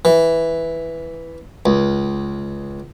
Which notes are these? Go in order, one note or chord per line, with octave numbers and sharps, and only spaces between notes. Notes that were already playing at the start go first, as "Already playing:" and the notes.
E3
C#2